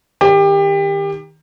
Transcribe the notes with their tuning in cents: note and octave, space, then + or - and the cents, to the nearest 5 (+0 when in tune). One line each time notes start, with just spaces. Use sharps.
D#3 +0 G4 +25